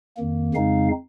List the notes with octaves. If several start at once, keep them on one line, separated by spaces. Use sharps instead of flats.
F2 D#3 A#3
F2 C#3 G#3 C4 D#4 F5